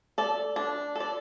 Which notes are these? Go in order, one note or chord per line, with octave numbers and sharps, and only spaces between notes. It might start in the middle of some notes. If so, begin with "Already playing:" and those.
A4 D5
D4
A4 D5